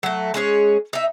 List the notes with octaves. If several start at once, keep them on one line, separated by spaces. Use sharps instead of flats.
F#3 A3
G#3 C#4 G#4 C#5
D#4 E5